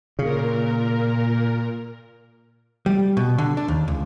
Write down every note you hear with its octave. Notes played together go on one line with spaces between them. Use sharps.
A#2 C#3 A#4
G3
B2
D3
D4
D#2
C#2